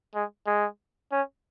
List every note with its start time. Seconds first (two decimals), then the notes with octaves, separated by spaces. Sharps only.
0.14 G#3
0.47 G#3
1.12 C#4